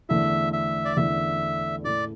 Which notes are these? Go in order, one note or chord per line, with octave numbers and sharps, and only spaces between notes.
E2 D3 A3 E4 E5
E5
D5
E2 D3 A3 E4 E5
A2 A3 E4 D5